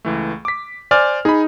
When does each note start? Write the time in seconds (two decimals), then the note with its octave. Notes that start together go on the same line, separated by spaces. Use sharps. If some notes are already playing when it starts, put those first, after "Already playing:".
0.05 C#2 E3 A3
0.45 D6 B6
0.91 C5 D5 G#5 F6
1.25 D#4 G#4 B5